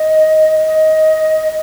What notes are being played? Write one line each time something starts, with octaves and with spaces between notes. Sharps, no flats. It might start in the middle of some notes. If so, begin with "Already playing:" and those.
Already playing: D#5
D#5